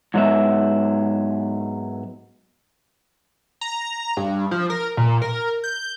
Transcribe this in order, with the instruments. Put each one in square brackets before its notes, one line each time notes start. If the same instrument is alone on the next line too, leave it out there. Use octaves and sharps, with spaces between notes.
[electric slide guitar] G#2 F#3 B3 E5
[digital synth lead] A#5
G2
F3
A#4
A#2
A#4
G6